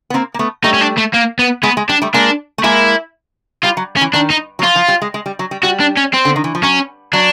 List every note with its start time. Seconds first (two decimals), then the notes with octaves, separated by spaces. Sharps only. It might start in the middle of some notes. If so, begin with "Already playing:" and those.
0.10 B3
0.14 A#3 C4
0.34 A#3
0.39 A3 B3
0.64 G3 A3 D#4
0.74 C#4
0.81 D4
0.97 A3
1.13 A#3
1.39 B3
1.63 G#3 B3
1.77 G#3
1.89 G3 D4
2.02 G3 A3
2.14 G#3 A#3 D4
2.58 A3
2.64 G#3 A#3 E4
3.64 G3 F4
3.77 F#3
3.97 C#4
4.01 E3
4.13 D#3 D4
4.30 D#4
4.59 F#3
4.63 F3 F4
4.76 F3
4.88 G3
5.02 G#3
5.14 G#3
5.26 G3
5.39 F#3
5.51 G3
5.63 G3 F#4
5.80 D4
5.97 C#4
6.14 C4
6.25 D3
6.36 D#3
6.44 E3
6.55 F3
6.63 F#3 C#4
7.13 F#3 D4